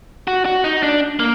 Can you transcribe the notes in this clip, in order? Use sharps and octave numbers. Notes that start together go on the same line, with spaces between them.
F#4
F#4
D#4
D4
A#3